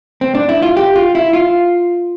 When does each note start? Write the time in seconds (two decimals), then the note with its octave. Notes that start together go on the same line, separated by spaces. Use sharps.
0.21 C4
0.35 D4
0.49 E4
0.63 F4
0.77 G4
0.96 F4
1.15 E4
1.33 F4